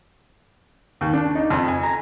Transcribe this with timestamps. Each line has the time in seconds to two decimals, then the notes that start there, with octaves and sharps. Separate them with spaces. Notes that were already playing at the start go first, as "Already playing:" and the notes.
1.01 D#2
1.13 D4
1.35 D#4
1.50 F2
1.68 G#5
1.83 A#5